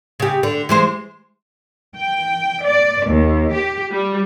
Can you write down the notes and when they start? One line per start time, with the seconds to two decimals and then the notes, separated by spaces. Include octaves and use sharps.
0.20 C#3 G4
0.43 D3
0.69 E3 G#3 C5
1.96 G5
2.64 D5
3.06 D#2
3.53 G4
3.93 G3